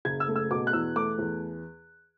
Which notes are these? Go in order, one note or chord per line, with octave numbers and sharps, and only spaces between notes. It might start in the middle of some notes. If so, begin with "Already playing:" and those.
F#1 G#6
E6
A3
E6
B2 D6
F#6
E2 E6
A3 D6
E2